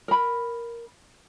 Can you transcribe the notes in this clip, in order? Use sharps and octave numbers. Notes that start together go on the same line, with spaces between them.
A#4 B5